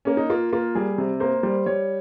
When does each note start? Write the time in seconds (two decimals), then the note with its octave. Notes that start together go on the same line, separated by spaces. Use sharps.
0.05 A#3 C#4
0.17 D#4
0.30 A#3 F4
0.53 A#3 F4
0.75 G3 G#4
0.98 C3
1.20 A#3 C5
1.43 G3 C5
1.66 G3 C#5